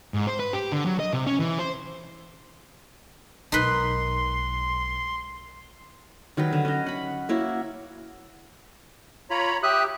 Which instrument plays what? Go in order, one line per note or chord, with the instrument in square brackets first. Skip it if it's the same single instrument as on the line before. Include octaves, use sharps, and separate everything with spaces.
[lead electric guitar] G#2
C5
B4
G4
D3
F#3
D#5
C3
C#4
E3
C5
[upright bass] B1 [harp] G#3 A#4 [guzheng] D#4 B4 [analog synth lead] C6
[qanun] D#3 F#3 G3 B4
D3
C#4 D#5
F#5 B5
A#3 E4 F#4 C#5
[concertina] F4 [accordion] C#5 A#5 B5
[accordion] G4 [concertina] E5 D#6 F#6